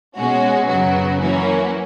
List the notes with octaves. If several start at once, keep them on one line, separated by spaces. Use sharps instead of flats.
B2 G#3 C#4 F#4
F#2 C#3 F#3 B3 F#4
E3 A#3 C#4 F#4